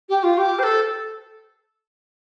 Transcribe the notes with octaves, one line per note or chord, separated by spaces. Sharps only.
G4
F4
G4
C5
A4